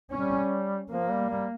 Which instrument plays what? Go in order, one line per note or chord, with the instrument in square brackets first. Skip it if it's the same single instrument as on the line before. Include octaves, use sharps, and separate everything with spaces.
[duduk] G3 [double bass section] C#4
[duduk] F3 [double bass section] A#3
[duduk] G3
G3